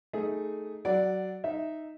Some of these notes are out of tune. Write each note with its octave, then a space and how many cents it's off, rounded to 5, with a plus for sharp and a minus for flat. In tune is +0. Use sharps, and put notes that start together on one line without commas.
A3 +0 D#4 +0 G#4 +5
F#3 +20 D5 +0 F#5 +0
D#4 +0 E5 +0